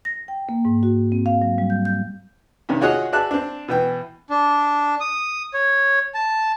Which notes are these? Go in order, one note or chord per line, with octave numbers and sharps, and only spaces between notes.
A#6
G5
A#3
G#2
F#4
C4
F5
F#3
G3
G6
G6
G2 C3 D#3 C#4
F4 F#4 G#4 C#5 D#5 F#5
F#4 G#4 D5 E5 A5 F#6
C4 D4
B2 E3 G5
D4
D#6
C#5
A5